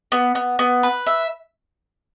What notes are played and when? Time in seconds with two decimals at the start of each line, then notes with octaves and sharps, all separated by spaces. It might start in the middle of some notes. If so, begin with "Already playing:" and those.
0.12 B3
0.35 B3
0.59 B3
0.83 B4
1.07 E5